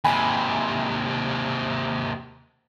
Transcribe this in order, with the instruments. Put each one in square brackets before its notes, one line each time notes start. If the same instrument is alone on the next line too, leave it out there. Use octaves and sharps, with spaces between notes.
[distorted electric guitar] D#2 C3 [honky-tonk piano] G#5 B5